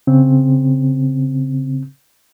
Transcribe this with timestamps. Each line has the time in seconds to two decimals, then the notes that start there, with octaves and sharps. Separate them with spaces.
0.07 C#3 C4